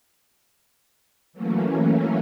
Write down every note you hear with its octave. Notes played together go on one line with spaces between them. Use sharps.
E3 F#3 A3 A#3 C#4